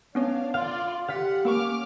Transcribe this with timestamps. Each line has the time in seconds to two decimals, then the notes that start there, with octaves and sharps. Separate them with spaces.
0.15 B3 C#4 D4 C#5 F5
0.54 F4 D5 F5
1.08 G4 F5 F#5 A6 B6
1.45 A#3 C#4 A#4 C#6 D6 F6